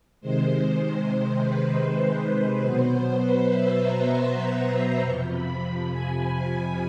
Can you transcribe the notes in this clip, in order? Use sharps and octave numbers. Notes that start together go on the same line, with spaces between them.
C3 D#3 G#3 C5
B4
B4
B2 F#3 B3 C5
B4
E5
A#5
C6
C6
F2 C3 F3 C#6
B5
G#5